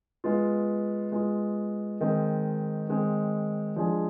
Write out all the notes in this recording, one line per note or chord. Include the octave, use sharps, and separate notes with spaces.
G#3 B3 F4
G#3 B3 F4
D#3 G#3 C4
D#3 G#3 C4
F3 G#3 D4 F4 G#4